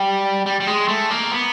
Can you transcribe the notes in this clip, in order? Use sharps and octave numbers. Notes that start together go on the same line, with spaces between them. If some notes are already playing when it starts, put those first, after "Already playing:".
Already playing: G3
G3
G3
G#3
A3
A#3
B3